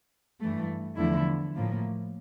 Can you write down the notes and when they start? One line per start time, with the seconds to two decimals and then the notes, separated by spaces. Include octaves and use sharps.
0.41 G2 E3 A3
0.97 E2 D3 F3 A3 E4
1.55 A2 F3 A#3